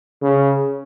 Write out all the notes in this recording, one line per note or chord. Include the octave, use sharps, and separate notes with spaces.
C#3